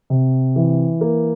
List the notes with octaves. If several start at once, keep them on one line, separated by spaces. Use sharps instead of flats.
C3
E3
A#3